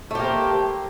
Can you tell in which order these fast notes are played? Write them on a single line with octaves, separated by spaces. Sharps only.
A3 G4 A#3 C5